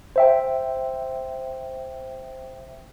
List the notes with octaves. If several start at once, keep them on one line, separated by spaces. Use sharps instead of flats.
C5 E5 G5